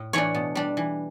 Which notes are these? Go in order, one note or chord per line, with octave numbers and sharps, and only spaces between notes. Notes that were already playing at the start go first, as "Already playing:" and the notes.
Already playing: A2
E3 A3 D4 C#5
B2
G3 D4
E3